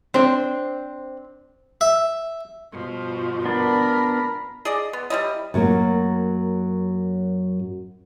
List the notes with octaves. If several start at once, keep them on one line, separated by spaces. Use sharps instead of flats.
C4 D4 C5
E5
G2 B2 F3
B3 D4 A#4 B5
G#4 D5 D#5
B3
G3 C#4 E4 D#5
F#2 F#3 A#3 F#4